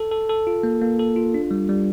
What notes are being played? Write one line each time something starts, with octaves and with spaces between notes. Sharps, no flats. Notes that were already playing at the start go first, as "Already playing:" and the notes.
Already playing: A4
A4
A4
F4
A#3
A#3
A4
F4
D4
G3
G3